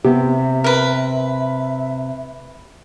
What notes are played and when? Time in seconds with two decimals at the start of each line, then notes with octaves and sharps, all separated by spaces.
0.05 C3 B3 G4 E5
0.64 A#4 B4